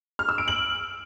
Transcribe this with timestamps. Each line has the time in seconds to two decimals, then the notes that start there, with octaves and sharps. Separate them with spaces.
0.19 F6
0.29 E6
0.38 D7
0.48 F#7